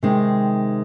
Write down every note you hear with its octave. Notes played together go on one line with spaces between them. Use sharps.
C3 D#3 G#3 C4 D#4